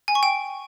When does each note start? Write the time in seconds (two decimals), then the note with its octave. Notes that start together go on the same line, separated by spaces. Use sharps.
0.08 G#5
0.15 C#6
0.23 G5